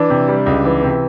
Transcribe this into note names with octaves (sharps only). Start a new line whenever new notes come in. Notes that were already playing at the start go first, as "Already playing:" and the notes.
Already playing: E3 D4
C3
G3
C#2
E3
C3